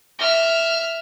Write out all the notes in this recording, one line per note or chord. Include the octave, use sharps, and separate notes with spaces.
E5 F6